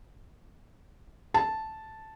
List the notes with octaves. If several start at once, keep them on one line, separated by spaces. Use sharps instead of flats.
A5